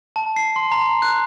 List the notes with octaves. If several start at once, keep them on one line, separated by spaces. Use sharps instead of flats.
A5
C7
C6
A#5
F#6